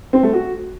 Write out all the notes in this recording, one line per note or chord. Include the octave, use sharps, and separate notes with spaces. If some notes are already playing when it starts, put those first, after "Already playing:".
C4
A3
F#4